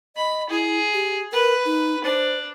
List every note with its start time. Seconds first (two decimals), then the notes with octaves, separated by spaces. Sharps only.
0.16 D#5 B5
0.50 E4 G#4
0.94 G4
1.33 A#4 B4
1.66 D#4
2.04 D4 C5